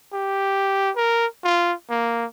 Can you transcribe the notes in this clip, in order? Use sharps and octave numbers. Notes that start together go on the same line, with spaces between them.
G4
A#4
F4
A#3